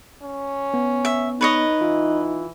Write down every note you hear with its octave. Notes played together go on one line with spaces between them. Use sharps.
C#4
B3
E5
D#4 B4 C#5 D#5
E3 F4